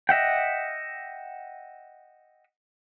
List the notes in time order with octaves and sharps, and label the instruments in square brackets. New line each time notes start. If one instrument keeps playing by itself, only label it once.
[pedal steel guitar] D#5 E5 F#5 G5